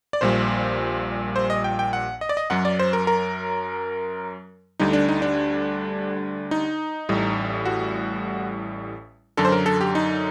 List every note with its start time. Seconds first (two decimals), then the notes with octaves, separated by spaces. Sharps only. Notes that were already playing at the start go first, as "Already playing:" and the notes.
0.13 D5
0.21 A#1 A#2 G3 C5
1.36 C5
1.50 D#5
1.64 G5
1.79 G5
1.93 F#5
2.21 D#5
2.29 D5
2.37 D#5
2.50 F#2 F#3 F#5
2.65 D5
2.79 C5
2.93 A#4
3.07 A#4
4.80 D2 D3 G3 D#4
4.93 D4
5.08 D#4
5.22 D4
6.51 D#4
7.09 A1 A2 G3
7.66 F#4
9.37 F#2 D3 F#3 A4
9.45 C5
9.52 A#4
9.66 A4
9.81 G4
9.95 D#4